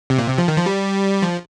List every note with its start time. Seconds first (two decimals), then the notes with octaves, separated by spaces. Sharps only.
0.10 C3
0.18 A#2
0.28 C3
0.38 F3
0.48 D#3
0.56 F3
0.66 G3
1.22 F3